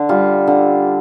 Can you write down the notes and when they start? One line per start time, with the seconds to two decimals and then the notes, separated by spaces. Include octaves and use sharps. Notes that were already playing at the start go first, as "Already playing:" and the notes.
Already playing: D3
0.09 G3 F4
0.47 D3